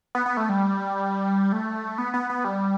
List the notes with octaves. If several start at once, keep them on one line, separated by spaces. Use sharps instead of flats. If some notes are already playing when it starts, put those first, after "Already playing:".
B3
B3
A3
G3
A3
B3
B3
B3
G3